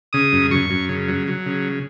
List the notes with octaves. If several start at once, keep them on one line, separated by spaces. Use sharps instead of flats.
C#3 D#6
F#2
F#2 C#6
F#2
C#3
F#3
F#3
C#3